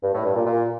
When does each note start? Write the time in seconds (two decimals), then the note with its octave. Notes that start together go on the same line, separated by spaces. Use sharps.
0.03 G2
0.14 A2
0.25 G2
0.35 A#2
0.46 A#2